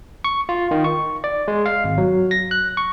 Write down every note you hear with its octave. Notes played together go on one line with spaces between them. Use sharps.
C#6
F4
D#3
C#6
D5
G#3
F5
G#1
F#3
A#6
F#6
C#6